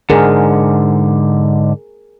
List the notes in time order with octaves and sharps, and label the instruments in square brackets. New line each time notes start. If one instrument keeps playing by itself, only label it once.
[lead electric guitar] G#2 D3 [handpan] G#4 A#4